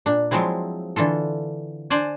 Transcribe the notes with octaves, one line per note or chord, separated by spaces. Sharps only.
A#2 D4
F3 F#3 G#3 C4 E4
D3 E3 F4 A4
D4 C5 D5 G#5